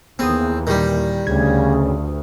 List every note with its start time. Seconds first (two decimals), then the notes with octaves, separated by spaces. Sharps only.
0.19 D#2 E3 B3 C4 G#4 D#6
0.67 A#2 D#3 G3
1.27 D2 C#3 G#6
1.85 G2